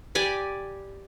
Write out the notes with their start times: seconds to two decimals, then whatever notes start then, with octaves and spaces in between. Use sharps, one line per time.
0.15 G4 D5 G#5 B5